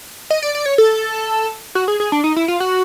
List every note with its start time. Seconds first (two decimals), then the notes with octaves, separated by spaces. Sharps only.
0.30 D#5
0.42 D5
0.55 D5
0.66 C#5
0.78 A4
1.75 F#4
1.88 G#4
2.00 G#4
2.12 D4
2.24 D#4
2.36 E4
2.48 F4
2.60 F#4